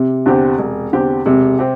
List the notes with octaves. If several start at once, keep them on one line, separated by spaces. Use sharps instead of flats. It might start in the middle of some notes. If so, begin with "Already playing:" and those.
Already playing: C3
E2 D3 C4 G4
E1
E2 D3 C4 G4
E1 C3
C4 G4